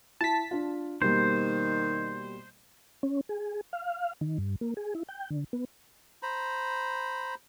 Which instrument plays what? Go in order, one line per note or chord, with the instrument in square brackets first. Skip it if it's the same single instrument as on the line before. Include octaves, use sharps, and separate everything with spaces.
[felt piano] E4 [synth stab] A5 B6
[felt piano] D4 F4
[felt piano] B2 G3 A#3 [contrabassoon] D#3 [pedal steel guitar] C5
[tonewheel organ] C#4
G#4
F5
D#3
G2
A#3
G#4
E4
G5
D3
B3
[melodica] C5 A#5 B5